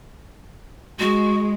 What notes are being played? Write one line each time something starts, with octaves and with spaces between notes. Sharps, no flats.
G#3 F#4